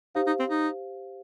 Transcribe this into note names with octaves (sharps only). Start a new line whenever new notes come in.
D#4 G4 C5 F5
D#4
C4
D#4